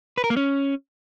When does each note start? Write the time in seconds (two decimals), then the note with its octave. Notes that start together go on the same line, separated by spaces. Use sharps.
0.18 B4
0.24 A#4
0.30 A#3
0.37 C#4